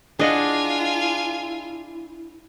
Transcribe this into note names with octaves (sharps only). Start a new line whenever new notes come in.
D4 E4 F4 G#4 D#5 F#5 G#5